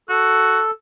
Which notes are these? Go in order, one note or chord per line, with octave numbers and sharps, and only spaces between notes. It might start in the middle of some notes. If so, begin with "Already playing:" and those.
F#4 A4